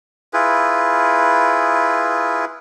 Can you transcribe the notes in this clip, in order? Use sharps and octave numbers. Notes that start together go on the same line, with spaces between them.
E4 F4 G#4 B4